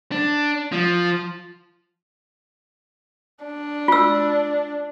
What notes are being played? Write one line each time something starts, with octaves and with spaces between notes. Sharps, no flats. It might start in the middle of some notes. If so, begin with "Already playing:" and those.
D4
F3
D4
F4 E6